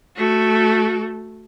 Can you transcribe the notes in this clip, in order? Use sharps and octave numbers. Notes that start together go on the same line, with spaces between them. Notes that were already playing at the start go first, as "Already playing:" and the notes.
A3 F#4